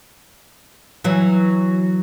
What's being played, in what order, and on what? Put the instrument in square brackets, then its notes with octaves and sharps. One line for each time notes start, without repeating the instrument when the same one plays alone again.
[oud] E3 F#3